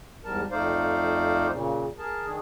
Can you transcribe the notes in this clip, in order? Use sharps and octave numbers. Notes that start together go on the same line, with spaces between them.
E2 G#2 G3 A#4 A5
F2 A3 D#4 C5 D5 F5
A#2 C#3
G#4 A#4 A5
D#3 D4 G#4